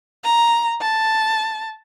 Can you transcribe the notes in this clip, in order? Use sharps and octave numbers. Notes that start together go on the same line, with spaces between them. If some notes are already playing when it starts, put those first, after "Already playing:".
A#5
A5